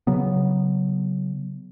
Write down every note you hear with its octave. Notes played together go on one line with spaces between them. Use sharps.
C#3 F#3 B3